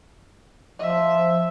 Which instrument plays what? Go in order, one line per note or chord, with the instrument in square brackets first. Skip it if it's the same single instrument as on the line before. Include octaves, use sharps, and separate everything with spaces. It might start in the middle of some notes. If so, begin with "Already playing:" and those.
[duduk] F3 [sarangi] E5